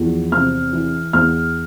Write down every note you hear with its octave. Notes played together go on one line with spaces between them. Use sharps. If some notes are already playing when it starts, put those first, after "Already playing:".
Already playing: E2 F3
C3 F6
E3
E2 F6